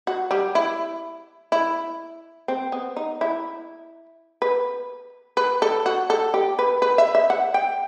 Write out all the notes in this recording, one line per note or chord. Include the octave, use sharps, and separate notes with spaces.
F#4
G3
E4
E4
C4
B3
D#4
E4
B4
B4
A4
F#4
A4
G4
B4
B4
E5
E5
F#5
G5